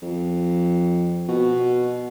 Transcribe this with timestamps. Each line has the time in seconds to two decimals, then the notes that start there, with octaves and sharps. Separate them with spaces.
0.03 F2
1.29 B2